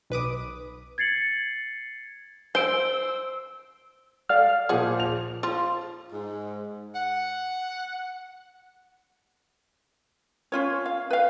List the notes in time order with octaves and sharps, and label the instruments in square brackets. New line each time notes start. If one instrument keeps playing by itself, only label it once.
[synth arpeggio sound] B1 B4 D6 D#6
[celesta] G#6 A6 C7 C#7 F#7
[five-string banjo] C5 [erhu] E6 [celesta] D7 G7
[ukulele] A4 D5 F5 [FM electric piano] F6
[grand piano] A#2 F3 [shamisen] G#4 F#5
[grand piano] F7
[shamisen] F3 F4
[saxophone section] G#2
F#5
[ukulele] C#4 F4 C#5
F5
B4 F5